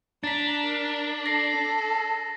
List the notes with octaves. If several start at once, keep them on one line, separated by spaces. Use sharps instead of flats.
D4 A#5 A6 B6
A#4
A4 A#6 C7